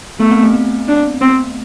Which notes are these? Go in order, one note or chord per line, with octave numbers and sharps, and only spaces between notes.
A3 B3
C4
A3
A3
D4
C4